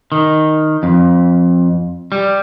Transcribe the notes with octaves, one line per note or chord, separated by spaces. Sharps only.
D#3
F2
G3